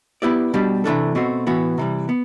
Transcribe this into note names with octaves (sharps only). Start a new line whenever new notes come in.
B3 E4 G4 B4 D5
B2 G3 D4 G4
C3 E3 A3 D4 A4
B2 A3 C4 F#4
A2 E3 B3 F#4
C3 E3 G3
B3